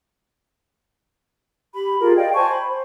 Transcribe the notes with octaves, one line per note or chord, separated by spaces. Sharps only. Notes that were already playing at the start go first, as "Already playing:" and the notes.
G4 B5
F4 G4 G#4 A#4
D5 D#5 F5 G5
C5 G#5 A5 C#6
B5
C5